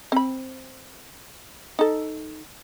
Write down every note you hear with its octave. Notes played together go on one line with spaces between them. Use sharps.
C4 B5
D#4 A4